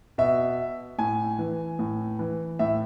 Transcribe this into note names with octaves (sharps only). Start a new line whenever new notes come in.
B2 E5
A2 G#5
E3
A2
E3
A2 E5